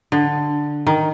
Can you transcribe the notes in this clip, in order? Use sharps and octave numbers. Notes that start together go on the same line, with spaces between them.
D3
D#3